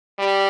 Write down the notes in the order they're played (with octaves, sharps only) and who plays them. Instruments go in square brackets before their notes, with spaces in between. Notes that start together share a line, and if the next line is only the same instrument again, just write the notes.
[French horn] G3